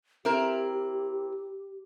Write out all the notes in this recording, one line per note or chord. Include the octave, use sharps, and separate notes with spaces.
C4 E4 G4 A#4